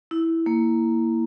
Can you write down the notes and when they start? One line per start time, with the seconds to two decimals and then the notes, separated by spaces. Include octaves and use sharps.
0.11 E4
0.46 A#3